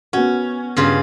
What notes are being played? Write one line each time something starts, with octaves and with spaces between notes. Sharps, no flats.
B3 C#4 F#4
G2 C#3 F4